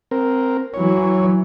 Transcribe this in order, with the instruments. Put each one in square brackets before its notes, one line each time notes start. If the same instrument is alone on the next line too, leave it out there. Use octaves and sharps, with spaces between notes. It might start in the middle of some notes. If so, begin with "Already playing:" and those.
[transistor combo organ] C4 A#4
[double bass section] E3 F#3 [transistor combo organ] C#5